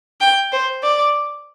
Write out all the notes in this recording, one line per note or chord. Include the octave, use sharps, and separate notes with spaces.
G5
C5
D5